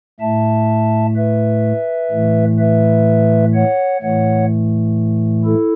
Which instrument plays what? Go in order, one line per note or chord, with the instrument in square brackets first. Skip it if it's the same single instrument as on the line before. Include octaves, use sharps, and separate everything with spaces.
[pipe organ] A2 A3 E5 A5
B4 E5
A2 E3 A3
B4 E5
C#5 F#5
A2 E3 A3 C#5 F#5
E4 A4